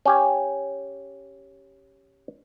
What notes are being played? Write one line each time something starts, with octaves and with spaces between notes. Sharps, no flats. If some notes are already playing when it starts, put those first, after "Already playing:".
C#4 G4 G#5